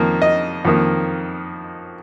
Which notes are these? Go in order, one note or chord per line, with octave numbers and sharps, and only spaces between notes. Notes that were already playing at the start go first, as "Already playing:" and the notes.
Already playing: F2 D#3 A#3
D#5
F2 D#3 A#3